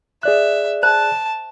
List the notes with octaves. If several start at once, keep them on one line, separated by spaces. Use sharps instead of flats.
G#4 D5 E5 F#6
C5 A5